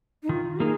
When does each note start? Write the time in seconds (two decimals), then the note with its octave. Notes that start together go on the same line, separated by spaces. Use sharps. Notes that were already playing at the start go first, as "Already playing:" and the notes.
0.23 D#4
0.29 D#3 F4
0.60 A#3 D#4 G#4 A#4